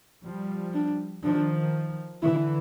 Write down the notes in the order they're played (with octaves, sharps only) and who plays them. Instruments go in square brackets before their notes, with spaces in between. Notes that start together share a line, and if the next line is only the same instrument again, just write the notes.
[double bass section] F3 G3
[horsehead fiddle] D4
[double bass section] D#3 F3 [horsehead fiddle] D4
[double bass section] D3 E3 [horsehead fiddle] E4